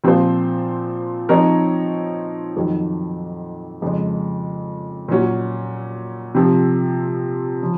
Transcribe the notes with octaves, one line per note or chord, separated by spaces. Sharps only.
A#2 F3 C4 F4 C5
F3 C4 D#4 A#4 C#5
F2 D#3 F#3
F2 C#3 G#3
A#2 F#3 C#4 F#4
C3 F3 C4
C#3 F3